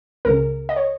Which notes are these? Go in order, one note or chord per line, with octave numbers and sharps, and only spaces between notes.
C#2 C#3 A#4
D#5
C#5